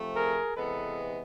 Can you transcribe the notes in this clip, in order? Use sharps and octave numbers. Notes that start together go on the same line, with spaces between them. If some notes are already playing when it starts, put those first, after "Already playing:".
Already playing: C3 F3 A3
G#4 A#4
C3 E3 G#3 B3 A4 B4